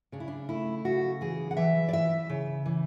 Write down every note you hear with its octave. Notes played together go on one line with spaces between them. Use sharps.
C#3 D4
E4
D4
A3 E4
C#3 F#4
E3 G#4
F#5
E3 E5
D5
E3 E5
C#3
E3